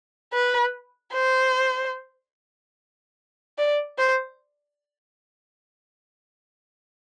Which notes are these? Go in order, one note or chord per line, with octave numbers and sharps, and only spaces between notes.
B4
C5
D5
C5